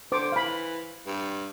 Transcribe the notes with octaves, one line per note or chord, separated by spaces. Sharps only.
D3 C5 D6
E3 F5 B5
G2